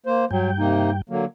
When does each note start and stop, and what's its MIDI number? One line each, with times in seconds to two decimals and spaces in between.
0.06 0.25 58
0.06 0.25 72
0.31 1.01 43
0.31 0.51 54
0.31 1.01 79
0.59 0.91 48
0.59 0.91 58
0.59 0.91 63
1.10 1.25 50
1.10 1.25 54
1.10 1.25 58